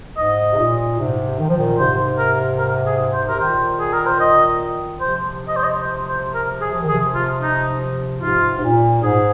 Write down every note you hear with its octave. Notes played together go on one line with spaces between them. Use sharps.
G#2 D#5
C3
A#2
G#2 C3
D#3
F3
A#2 D#3
G#2 C3 C5
A#4
A#4
G#4
C5
C3 A#4
A#2 D#3 C5
G#4
A#4
C5
D#5
C3 F3 C5
D#5
C5
D#5
C5
C5
A#4
G#4
F3
D#3
G#4
C3 F3
F4
D#4
G#2 C3 F4
G#2
A#2
G#2 G#4